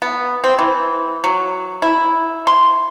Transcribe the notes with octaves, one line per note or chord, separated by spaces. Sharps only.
B3
C4
E3
F#3
E4
C6